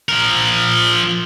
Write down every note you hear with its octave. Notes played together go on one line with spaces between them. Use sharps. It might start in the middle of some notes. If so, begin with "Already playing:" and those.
F3 A#4